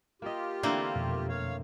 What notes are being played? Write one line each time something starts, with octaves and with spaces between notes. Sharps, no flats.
A#3 F4 G4 D#5
D3 E3 A3 A#3 C4 C5
F2 B2
C#5 F5